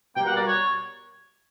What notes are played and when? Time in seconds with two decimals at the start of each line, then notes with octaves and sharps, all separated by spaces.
0.16 B2 G3 A#3 G5
0.26 F#5
0.36 D5
0.46 C#5